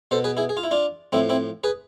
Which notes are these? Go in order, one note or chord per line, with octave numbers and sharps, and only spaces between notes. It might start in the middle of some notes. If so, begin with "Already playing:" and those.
B2 A4 C5
G#4 B4
E4 G#4
G#4
F4
E4
D4 F4
A2 F3 C4 E4
C4 E4
G#4 B4